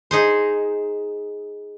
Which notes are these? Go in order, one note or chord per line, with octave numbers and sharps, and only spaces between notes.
D#4 G#4 C5